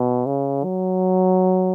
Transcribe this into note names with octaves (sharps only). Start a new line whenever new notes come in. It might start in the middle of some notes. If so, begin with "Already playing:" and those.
Already playing: B2
C#3
F#3